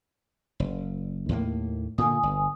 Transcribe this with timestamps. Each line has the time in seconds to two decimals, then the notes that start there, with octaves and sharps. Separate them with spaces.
0.60 F#1
1.29 D#2 A2 A#3
1.98 A#2 D3 A#3 G#5 D#6
2.23 G1